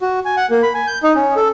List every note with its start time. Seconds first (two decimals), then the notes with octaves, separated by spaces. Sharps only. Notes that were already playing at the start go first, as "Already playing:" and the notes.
0.01 F#4
0.25 G#5
0.37 F#5
0.50 A#3
0.63 B5
0.74 G#5
0.87 G6
1.03 D#4
1.15 C#4
1.36 A4